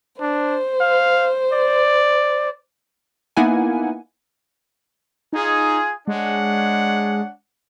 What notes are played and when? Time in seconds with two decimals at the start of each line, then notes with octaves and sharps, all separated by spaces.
0.21 D4 C5
0.80 F5
1.53 D5
3.37 A#3 B3 D#4 E4 F#5 G#5
5.33 D#4 F4 G#4
6.08 G#3 D4 C#5 F#5